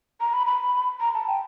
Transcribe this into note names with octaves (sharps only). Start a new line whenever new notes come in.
A#5
B5
B5
A#5
A5
G5